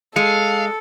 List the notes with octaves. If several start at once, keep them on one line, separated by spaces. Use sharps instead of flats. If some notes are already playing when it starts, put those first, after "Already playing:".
G#3 A4 F5 C#7